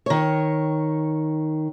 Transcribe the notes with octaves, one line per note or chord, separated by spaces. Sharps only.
D#3 C#5